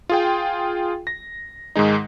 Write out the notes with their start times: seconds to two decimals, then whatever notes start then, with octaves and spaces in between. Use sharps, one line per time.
0.09 F4 G#4 G5
1.07 A#6
1.75 G#2 D#3 G#3 D#4